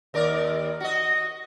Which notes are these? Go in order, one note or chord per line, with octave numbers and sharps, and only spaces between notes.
D#2 A#4 D5
F#4 D#5